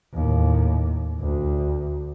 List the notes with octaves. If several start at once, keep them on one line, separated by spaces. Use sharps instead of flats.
D#2 A2
D2